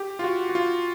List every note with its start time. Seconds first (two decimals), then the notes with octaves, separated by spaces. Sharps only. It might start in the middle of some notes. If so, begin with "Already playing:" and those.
Already playing: G4
0.19 F4
0.24 F#4
0.49 F#4
0.55 F4